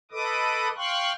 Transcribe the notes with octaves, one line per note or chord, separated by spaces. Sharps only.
A4 B4 D#5 D6 D#6
F5 G5 C6 C#6 F#6